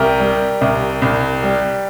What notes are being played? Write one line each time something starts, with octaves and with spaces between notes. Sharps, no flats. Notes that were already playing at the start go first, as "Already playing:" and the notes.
Already playing: C2 G4 A#4
G3
C2
C2
G3